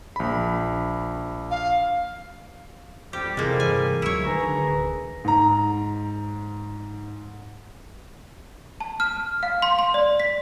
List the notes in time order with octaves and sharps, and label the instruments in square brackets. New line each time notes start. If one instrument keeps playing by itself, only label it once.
[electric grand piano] A#1 B5
[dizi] F5
[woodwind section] F2 G3 [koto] G4
[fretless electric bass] C3 E3 [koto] G#3 A#3
[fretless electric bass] G2 C3 E3 [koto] G#5
[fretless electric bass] D2 F3 F#3 [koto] E4 C#5
[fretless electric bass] D3 D#3 [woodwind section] G#4 B4 A#5
[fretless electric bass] D1
[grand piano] G#2 A#5
[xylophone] A5
F6
F5
C6
C6
D5
B6